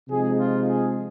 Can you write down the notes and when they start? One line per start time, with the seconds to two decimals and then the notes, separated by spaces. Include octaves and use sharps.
0.09 C3 F3 G#3 D#4 G#4
0.38 F4
0.67 G#4